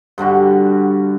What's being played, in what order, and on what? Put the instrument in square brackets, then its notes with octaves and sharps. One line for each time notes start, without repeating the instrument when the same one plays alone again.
[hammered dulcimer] G2 D3 G3 F#4